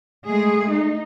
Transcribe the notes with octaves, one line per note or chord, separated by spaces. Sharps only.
G#3 A3 G#4
D#4